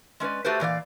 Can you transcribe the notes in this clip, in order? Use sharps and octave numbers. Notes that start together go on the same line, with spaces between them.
G#3 C#4 B4 D5
A3 F#4 G4 A4 B4 C5
A#2 E3 D5 F5